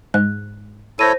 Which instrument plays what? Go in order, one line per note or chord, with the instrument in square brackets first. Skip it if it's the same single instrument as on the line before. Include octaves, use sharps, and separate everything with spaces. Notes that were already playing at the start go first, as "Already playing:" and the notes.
[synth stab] G#2 [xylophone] F#6
[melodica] E4 A4 C#5 [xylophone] C5 A#6 D#7